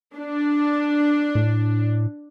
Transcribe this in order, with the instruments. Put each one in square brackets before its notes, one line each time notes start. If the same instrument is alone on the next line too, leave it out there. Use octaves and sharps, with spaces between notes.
[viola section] D4
[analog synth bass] A2